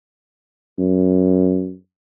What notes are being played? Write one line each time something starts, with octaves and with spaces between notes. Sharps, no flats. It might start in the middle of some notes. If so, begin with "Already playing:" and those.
F#2